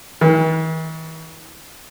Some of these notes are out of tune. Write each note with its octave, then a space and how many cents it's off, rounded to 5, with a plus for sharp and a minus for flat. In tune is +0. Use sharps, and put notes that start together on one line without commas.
E3 -45